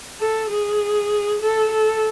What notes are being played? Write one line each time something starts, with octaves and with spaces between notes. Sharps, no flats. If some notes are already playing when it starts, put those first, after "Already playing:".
A4
G#4
A4
A4